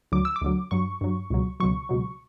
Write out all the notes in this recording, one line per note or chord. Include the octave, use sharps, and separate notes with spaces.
D2 D3 F#3 D6
E6
D6
D2 D3 F#3
G2 F#3 C#6
G2 F#3
C#2 B2 F#3
C#2 B2 F#3 C#6
C#2 B2 F#3